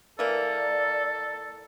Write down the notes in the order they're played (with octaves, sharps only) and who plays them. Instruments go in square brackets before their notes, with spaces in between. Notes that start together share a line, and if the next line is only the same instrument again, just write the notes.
[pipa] E3 A#3 [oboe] A4 [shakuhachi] D5